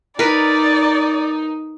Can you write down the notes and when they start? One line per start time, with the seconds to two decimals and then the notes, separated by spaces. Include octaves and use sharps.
0.19 D#4 A#4 B4 D5